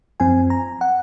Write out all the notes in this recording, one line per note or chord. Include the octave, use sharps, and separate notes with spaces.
F#2 F3 C4 G#5
A#5
F#5